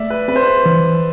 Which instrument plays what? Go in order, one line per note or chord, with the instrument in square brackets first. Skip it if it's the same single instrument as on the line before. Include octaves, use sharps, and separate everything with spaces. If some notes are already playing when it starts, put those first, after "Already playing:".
Already playing: [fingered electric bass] A3 [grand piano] D5 E5
[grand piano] B4
[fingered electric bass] C4 [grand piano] B4
[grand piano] C5
B4
[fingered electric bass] E3